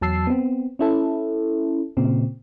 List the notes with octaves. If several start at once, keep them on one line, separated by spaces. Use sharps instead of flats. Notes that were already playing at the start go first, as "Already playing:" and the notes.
E2 F#3 A5 E6 C7
B3 C4
C#4 E4 A4
A#2 C#3 C4